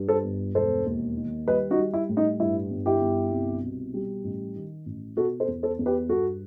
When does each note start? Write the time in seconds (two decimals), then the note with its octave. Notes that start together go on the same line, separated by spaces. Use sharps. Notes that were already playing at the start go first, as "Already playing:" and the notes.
Already playing: G2
0.09 A4 C5
0.24 G1
0.55 E1 A4 C5
0.86 D#2
1.17 D#3
1.47 G3 B4 D#5
1.71 D#4 F#4
1.78 G3
1.94 E4
2.09 A2
2.17 D#4
2.40 G2 E4
2.71 G1
2.86 E4 G4
3.01 G1
3.32 C2
3.63 B2
3.94 G3
4.24 A1
4.55 D#3
4.86 A1
5.17 B2 F#4 A4
5.40 A4 C5
5.48 E2
5.63 A4 C5
5.79 E2
5.86 G4 B4
6.09 G2 F#4 A4